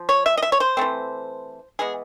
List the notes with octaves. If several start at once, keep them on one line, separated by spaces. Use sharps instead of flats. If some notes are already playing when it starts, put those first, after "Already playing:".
Already playing: F3
C#5
E5
D#5
E5
C#5
C5
E3 A3 C4
E3 G#3 B3 G#4